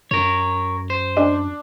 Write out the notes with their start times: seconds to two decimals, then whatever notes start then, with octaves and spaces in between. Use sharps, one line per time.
0.11 F#2 A#4 C#5
0.90 C5
1.17 D4